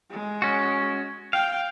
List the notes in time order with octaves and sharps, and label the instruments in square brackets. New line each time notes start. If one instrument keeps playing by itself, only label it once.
[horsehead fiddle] G#3
[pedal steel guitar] C#4 F#4
[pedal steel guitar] F5 [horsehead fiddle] G5